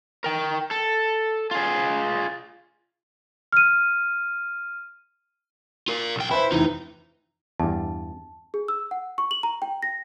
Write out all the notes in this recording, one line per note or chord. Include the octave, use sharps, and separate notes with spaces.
A#4 G5
A4
F4 G#4
F6 D#7
F4 A#4
B1 G5
E4 B4 C5 B5
F1 E3 D#4
E2 G2 A5
G#4
E6
F#5
C#6
F#7
A#5
G5
A#6